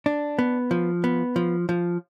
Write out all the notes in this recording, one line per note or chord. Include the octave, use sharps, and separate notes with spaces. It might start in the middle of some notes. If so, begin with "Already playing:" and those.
D4
B3
F3
B3
F3
F3